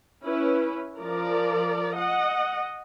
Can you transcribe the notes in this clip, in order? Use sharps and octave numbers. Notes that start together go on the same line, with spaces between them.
C#4 E4 B4
F3 A#4 D5
D#5 F#5